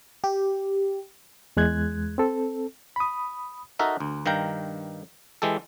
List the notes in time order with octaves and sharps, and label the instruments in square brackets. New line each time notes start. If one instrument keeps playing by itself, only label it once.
[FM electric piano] G4
[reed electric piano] E2 G#3 F#6 G#6
C4 A4
B5 D#6
[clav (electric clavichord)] D#4 F#4 A4 A#4 E5
D2
G2 D#3 F5 G5 A#5
E3 G#3 G4 A4